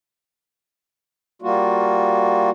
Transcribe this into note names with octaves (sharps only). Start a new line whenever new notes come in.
G3 A#3 F4 F#4